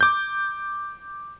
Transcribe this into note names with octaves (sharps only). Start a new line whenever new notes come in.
D6 G6